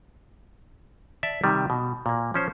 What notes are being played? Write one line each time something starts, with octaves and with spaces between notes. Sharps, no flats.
D5 E5 A5
C3 D#3 G3
B2
A#2 A#3
F3 C#4 C5